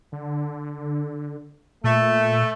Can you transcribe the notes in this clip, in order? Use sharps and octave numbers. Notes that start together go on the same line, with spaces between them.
D3
A#2 A3